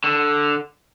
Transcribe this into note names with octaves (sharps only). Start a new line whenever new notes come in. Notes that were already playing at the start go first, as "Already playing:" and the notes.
D3